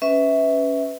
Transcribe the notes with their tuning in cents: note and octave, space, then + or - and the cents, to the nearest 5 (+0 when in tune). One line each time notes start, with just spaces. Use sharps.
C#4 +10 B4 +15 E5 -20